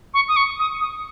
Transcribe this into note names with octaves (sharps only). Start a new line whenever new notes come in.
C#6
D#6
C#6
D#6
D#6